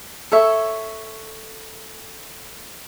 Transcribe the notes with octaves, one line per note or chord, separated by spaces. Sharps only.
A4 C#5 E5